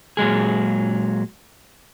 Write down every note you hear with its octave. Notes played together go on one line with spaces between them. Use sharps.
A#2 F#3 G#3 G#4